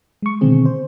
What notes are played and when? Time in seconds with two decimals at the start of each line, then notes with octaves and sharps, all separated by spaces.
0.22 G#3 C#6
0.41 B2 D3 D#3 C4 G#4
0.66 C5